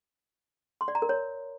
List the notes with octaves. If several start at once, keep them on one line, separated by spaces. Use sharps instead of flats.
C6
D5
A#5
A#4
C#5